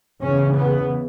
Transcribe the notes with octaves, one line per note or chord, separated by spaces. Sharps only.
E2 C#3 C#4
B3